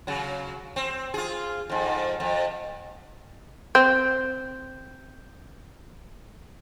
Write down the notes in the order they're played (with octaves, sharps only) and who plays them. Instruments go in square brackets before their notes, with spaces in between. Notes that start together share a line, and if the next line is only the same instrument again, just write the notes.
[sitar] C#3 F#3
C4
F4 G#4
F2 G#2
F2
[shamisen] C4 [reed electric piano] G6